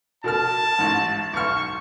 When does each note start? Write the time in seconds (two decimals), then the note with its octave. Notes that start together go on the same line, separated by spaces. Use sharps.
0.24 B2 A#4 A5 F6
0.79 A1 G#2
1.33 B1 C#6 F6